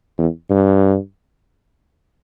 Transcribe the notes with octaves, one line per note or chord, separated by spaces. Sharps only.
E2
G2